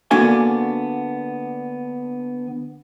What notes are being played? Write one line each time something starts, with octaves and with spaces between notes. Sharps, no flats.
D3 A#3 B3 D4 F#4 G#5